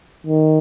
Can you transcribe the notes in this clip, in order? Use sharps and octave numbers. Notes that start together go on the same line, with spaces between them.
D#3